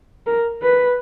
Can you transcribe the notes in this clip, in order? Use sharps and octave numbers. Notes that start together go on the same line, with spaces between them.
A#4
B4